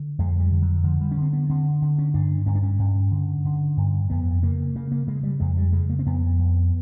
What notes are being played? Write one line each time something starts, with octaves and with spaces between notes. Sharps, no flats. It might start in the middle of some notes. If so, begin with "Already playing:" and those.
Already playing: D3
F2 G#3
G3
D3
F#3
D3 F3
G3
C#4
D3
C4
B3
D3 C4
D3
C#4
G2 D4
G2 C#4
D4
C#4
G2
D3
D3
G2
F2 B3
C#3 A#3
C#3 A#3
A#3
C#3 G#3
G3
F2 G#3
G3
C#3 G#3
A#3
C4
F2 B3
F2